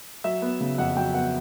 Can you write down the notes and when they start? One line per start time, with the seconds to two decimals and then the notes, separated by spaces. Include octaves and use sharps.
0.24 F#3 E5
0.42 B3
0.60 C#3
0.78 F2 F#5
0.97 F#3 G5
1.14 B3 F#5